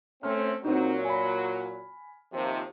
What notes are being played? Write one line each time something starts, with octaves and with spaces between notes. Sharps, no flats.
A3 C4 C#4 F6
A#2 F#3 C4 D#4
G#5 B5
D#2 C3 F3